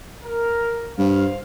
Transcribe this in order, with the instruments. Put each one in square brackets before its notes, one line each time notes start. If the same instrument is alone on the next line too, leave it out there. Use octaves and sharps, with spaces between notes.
[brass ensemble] A#4
[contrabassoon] G2 [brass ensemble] C5 F5